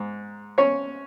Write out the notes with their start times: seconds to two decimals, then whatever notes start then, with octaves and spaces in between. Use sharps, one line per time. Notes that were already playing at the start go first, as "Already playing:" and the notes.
Already playing: G#2
0.58 C#4 C#5